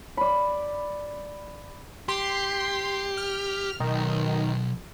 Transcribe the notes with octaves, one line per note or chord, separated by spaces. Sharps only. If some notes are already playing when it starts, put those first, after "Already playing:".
D5 B5
G4 C6
F6
B1 D#3